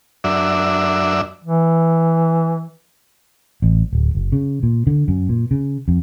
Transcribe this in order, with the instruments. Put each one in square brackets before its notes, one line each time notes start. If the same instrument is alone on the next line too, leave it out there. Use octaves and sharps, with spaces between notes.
[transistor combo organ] F#2 D4 E5
[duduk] E3
[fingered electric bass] A1
D1
F#1
C#3
A#2
D3
F#2
A#2
C#3
F2